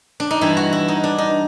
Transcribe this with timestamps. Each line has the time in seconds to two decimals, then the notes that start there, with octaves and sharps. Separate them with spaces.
0.20 D4
0.31 D#4
0.41 G2 E3 E4
0.57 F#4
0.73 E4
0.88 D#4
1.04 D4
1.18 D#4